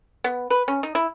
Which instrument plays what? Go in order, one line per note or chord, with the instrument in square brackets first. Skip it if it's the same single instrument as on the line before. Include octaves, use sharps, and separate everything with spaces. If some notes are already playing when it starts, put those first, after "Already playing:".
[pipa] B3
B4
C#4
D#4
E4